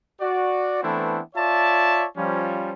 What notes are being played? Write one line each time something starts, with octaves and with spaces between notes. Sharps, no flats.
F#4 D5
E3 A3 B3 C4 D4 E4
F4 C#5 D5 E5 A5
F3 G3 C#4